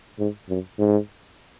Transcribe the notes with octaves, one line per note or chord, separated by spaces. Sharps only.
G#2
F#2
G#2